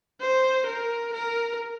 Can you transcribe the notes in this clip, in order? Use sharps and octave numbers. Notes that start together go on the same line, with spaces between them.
C5
A#4
A#4